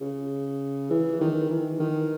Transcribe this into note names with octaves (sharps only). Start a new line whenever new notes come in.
C#3
E3
D#3
E3
D#3